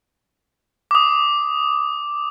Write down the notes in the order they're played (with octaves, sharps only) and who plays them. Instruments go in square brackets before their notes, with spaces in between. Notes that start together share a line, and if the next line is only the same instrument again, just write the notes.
[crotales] D6 D#6